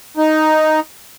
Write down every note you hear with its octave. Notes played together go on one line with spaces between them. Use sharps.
D#4